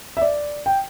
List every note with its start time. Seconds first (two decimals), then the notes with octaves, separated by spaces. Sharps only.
0.17 E5
0.22 D5
0.66 G5